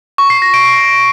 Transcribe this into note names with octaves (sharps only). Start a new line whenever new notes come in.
C#6
C7
A#6
D7